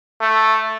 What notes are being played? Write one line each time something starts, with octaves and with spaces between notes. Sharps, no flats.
A3